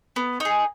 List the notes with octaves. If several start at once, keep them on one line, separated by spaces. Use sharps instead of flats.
B3
D#4 G#4